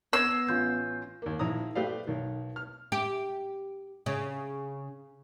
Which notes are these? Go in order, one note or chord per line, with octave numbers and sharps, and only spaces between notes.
B3 E6 G#6 A#6 C7
A1 C#4 F4 G6
D#2 A#3
A#1 D#3 E4 A#5 D#6
A3 G4 B4 C5 D5 F5
B1 D#3
F6
G4
C#3